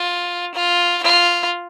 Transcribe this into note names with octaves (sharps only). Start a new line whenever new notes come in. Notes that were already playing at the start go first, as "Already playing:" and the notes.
Already playing: F4
F4
F4